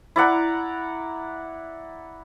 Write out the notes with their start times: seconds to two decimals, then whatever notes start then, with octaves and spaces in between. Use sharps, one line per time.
0.16 E4 D5 F#5 A#5